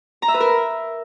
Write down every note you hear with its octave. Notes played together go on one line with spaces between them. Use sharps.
A#5
E5
B4
A#4